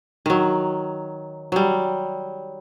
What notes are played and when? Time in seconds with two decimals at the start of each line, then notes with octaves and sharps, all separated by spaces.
0.26 D#3 F#3
1.52 F#3 G3